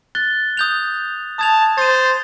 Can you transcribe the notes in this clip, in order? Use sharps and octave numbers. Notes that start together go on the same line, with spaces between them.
F#6 A6 G7
D#6 G6 F7
A5 D#6 G#6 F7
C5 A6 D#7